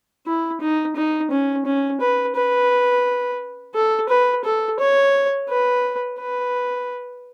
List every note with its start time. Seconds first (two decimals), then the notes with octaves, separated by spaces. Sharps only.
0.26 E4
0.61 D#4
0.96 D#4
1.31 C#4
1.65 C#4
2.01 B4
2.35 B4
3.75 A4
4.09 B4
4.44 A4
4.79 C#5
5.49 B4
6.19 B4